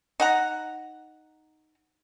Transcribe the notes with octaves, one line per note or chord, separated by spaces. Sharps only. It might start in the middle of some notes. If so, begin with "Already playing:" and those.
D#4 F#5 A#5